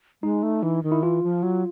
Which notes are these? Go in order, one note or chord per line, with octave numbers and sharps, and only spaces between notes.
G#3 D#4
A3
E3
D#3
E4
E3 F4
F3
F#3